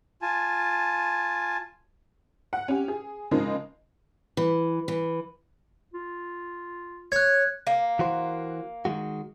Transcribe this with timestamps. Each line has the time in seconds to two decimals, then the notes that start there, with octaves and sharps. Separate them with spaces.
0.22 F4 G#5 A5
2.53 F#5
2.68 C#4 G4
2.88 G#4
3.31 C#3 F3 G#3 A#3 D#4
4.37 E3
4.88 E3
5.94 F4
7.12 C#5 F#6 G#6
7.67 A#3
7.99 E3 F#4 C5
8.85 D#3 G#3 F#4